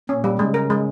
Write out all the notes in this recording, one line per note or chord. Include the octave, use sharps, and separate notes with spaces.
A#2 C#4
G3
C#3 G#3
A#4
G#3